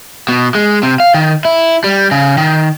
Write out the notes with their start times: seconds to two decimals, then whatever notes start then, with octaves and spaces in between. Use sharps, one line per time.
0.29 B2
0.55 G#3
0.83 C3
1.00 F5
1.14 D#3
1.45 E4
1.84 G3
2.11 C#3
2.38 D#3